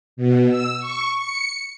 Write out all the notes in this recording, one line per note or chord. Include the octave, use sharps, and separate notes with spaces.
B2
E6
C#6
C#7